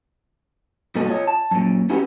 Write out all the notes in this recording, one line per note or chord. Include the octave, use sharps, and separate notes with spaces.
G2 B2 A#3 F#4 A4 D#5
F4 C#5 D#5
A5
F#2 A#2
C#4 D#4 E4 F#4 G4 B4